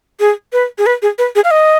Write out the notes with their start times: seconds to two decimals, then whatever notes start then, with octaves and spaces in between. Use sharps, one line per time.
0.20 G#4
0.53 B4
0.78 G#4
0.86 B4
1.02 G#4
1.18 B4
1.36 G#4
1.44 F5
1.51 D#5